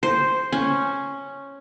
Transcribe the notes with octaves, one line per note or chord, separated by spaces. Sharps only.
C5
C#4